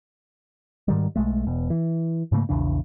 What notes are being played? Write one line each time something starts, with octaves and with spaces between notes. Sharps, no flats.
G#2 D#3 G3
B1 G#3 A3
E1 B2
E3
G#2 C#3 A3 A#3
A#1 E2 C#3 D4